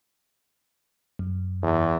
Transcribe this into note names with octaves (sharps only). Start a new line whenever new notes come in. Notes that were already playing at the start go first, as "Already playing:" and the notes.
F#2
E2